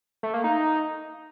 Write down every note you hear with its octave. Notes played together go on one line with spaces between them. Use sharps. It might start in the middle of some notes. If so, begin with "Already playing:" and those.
A3
A#3
D#4